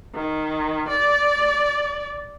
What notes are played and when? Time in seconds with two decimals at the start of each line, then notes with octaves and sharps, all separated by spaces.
0.14 D#3
0.89 D5